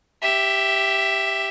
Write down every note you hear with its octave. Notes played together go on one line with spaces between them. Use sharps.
G4 E5